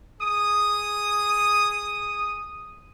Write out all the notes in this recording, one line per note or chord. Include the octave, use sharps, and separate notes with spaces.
G#4 D#6